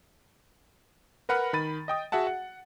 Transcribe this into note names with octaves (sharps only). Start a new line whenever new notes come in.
A#4 B4 F#5 B5 F6
D#3 B5 A6 D#7
D#5 G5 D#6
F#4 G#4 E5 F#5 A5
F#5